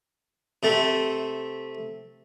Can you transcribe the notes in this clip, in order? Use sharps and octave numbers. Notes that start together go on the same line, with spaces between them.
C3 A3